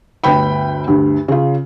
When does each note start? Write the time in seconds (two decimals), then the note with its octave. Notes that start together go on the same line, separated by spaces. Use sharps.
0.24 G1 D2 B4 G5 B5
0.87 D2 G2
1.28 C#3 F4